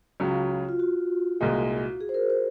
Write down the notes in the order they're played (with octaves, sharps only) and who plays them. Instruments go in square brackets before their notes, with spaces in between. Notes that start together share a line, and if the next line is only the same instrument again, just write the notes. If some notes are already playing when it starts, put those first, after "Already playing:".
[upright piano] C#2 C#3 F#3 [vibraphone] F#4
[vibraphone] F4
F#4
[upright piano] C2 A#2 G#3
[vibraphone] G#4
C5
A#4
C5